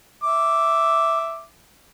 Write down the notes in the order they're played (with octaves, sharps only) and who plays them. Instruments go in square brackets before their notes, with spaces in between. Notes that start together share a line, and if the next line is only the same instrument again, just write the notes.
[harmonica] E5 D6